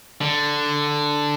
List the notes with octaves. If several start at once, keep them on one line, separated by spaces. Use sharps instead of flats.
D3